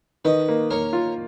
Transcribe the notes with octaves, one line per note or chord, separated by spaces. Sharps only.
D#3 B4 D#5
A#3
A#3 A#4 C#5
F4